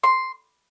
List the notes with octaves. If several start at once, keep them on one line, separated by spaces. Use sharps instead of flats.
C6